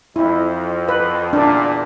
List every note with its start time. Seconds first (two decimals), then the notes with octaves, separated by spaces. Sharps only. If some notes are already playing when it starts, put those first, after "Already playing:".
0.16 F2 E4
0.89 B4
1.33 E2 A#2 D4